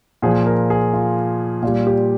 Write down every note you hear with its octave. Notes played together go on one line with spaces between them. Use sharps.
A#2 F3 G#4
A#4
G#4
F4
A#2 G3 F4
G4